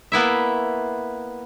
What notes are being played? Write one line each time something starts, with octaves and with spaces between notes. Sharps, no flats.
A#3 B3 E4 E5